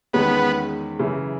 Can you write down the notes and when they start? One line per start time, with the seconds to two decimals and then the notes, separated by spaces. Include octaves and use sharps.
0.13 E2 D#3 G#3 B3 C#4
0.99 F#2 C#3 E3